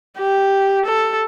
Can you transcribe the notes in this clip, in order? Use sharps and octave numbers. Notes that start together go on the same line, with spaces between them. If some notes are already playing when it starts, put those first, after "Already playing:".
G4
A4